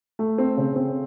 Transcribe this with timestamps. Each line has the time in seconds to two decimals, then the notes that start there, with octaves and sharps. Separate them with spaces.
0.19 A3
0.38 C4
0.57 C#3
0.76 C4